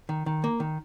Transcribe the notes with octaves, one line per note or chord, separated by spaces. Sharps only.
D#3
D#3
A#3
D#3